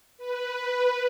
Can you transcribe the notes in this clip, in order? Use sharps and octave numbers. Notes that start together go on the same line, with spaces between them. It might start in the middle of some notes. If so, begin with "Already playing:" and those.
B4